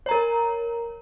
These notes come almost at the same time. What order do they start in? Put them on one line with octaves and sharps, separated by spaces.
C#5 A#5 A#4